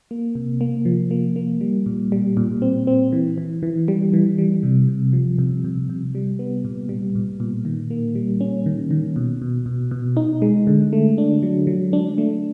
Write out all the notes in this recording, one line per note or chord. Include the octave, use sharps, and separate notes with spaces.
A#3
C3
A#3
F3
A#3
A#3
G3
A#2
G3
A#2
C4
C4
E3
E3
E3
G3
E3
G3
C3
C3
F3
C3
C3
C3
G3
B3
A#2
G3
A#2
A#2
D#3
A#3
G3
C#4
D#3
D#3
B2
B2
B2
B2
D#4
G#3
D3
A3
D4
F#3
F#3
D4
A3